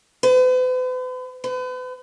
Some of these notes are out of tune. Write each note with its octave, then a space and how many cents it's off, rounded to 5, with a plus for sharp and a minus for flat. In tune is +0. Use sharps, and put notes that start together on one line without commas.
B4 +45
B4 +40